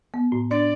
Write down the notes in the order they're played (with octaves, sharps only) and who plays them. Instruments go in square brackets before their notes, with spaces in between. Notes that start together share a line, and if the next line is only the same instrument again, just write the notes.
[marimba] B3
A2
[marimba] D4 [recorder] D5